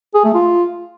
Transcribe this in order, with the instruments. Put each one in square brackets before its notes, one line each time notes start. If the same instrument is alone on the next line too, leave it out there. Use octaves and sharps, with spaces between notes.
[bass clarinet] G#4
A3
F4